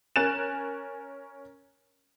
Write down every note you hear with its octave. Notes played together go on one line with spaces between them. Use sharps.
C#4 A#4 G#5 F#6 A6 E7